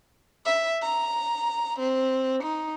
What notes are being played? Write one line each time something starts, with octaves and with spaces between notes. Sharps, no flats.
E5
A#5
C4
D#4